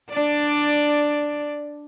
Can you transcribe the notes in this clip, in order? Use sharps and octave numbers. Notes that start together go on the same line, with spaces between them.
D4 D5